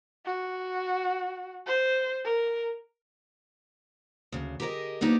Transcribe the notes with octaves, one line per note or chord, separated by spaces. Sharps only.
F#4
C5
A#4
D2 C#3
G4 G#4 A#4 C5 D#5
A#3 B3 D4 D#4 G4